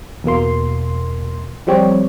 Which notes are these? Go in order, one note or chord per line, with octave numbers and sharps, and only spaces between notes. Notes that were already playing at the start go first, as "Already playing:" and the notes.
E2 B2 A#3 C6
F3 G3 C4 G4 C#5